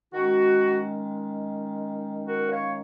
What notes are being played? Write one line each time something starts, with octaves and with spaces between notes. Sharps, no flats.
D#3 G#3 C#4 F#4
F#4 A#4
C#5 F5